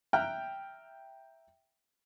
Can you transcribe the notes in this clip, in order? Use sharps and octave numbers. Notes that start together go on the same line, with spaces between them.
E5 G5 A#5 F6 F#6